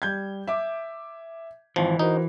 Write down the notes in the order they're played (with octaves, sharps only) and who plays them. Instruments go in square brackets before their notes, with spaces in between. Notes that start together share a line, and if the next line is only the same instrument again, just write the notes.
[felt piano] G3 G6 G#6
E5 D6
[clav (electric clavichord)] G#1 F3 [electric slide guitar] E3
[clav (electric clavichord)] D#4 [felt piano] F#4 A#4 C5